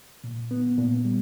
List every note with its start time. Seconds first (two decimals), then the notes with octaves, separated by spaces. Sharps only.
0.24 A#2
0.51 B3
0.78 A#2
1.05 G3